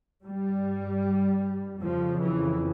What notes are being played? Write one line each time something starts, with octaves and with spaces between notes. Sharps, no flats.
G2 G3
F2 C#3 F3
E3